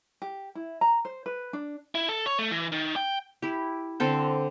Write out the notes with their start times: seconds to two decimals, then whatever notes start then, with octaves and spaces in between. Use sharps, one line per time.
0.22 G4
0.55 E4
0.81 A#5
1.05 C5
1.26 B4
1.53 D4
1.95 E4
2.09 A4
2.26 C#5
2.39 A3
2.51 E3
2.72 D#3
2.96 G5
3.42 E4 G4
4.00 D3 C4 A4 C5